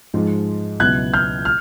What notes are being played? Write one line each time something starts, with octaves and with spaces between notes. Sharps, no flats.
G#2 F3 G#3
C#2 B2 F#3 B3 E4 F#6 G#6
F6 G6
F6